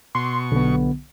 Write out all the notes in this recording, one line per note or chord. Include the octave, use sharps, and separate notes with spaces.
B2 C6 C#6
B1 D3 B3